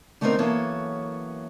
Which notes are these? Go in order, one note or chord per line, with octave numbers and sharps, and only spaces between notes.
D3 A3 B3 C4 D#4 A#4
F#2 E3 A#3 B3 A4 C#5